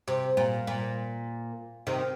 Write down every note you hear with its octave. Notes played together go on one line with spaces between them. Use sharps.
C3
A#2
A#2
C3 D#3